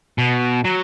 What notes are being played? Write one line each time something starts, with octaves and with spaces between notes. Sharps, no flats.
B2
F#3